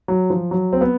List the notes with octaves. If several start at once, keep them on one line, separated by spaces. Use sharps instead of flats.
F#3
F3
F#3
C4
B3